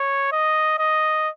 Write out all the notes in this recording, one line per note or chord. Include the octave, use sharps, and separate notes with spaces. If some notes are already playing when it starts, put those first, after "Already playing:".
Already playing: C#5
D#5
D#5